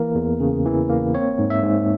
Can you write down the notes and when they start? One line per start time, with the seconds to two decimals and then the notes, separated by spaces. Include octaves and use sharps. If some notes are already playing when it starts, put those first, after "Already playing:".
Already playing: E3 A#3 A#4
0.15 E2
0.40 C#3
0.66 E3
0.89 A#3
1.14 C4 C#5
1.39 G#2
1.50 E5
1.63 G#2